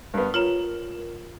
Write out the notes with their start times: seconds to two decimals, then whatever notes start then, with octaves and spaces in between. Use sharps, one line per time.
0.14 G2 B3 A#4
0.34 F4 C#5 A#5 E7 F#7